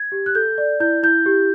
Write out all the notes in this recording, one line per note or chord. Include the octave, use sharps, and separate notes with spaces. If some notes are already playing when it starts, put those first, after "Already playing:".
Already playing: G#6
G4
F#6
A4 G6
D5
E4 G6
E4 G6
G4